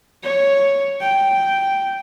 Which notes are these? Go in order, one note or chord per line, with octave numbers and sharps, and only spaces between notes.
C#5
G5